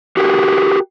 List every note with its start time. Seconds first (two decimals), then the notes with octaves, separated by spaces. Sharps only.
0.17 F#4 G4 A#4